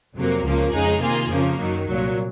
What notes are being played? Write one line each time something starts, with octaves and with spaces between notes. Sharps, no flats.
F2 C3 F#3 A#3
C#2 C#3 F3 A#3
F2 C#3 G#3 D#4 G#4
C3 D#3 A#3 F4 G#4
F2 C#3 F3 A#3
F#2 D#3 F#3
C2 A#2 F#3